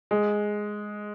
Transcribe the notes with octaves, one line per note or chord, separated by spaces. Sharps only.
G#3